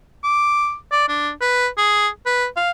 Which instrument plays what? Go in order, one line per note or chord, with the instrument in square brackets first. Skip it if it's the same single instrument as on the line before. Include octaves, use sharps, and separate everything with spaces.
[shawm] D6
D5
D4
B4
G#4
B4
F5